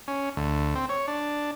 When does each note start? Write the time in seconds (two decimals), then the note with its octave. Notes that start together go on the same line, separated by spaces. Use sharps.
0.08 C#4
0.37 D2
0.75 C4
0.89 C#5
1.08 D4